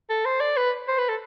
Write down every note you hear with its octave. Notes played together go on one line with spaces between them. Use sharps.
A4
C5
D5
B4
C5
B4
A4